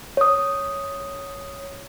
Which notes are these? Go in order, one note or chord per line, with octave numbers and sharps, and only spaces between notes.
C#5 D#6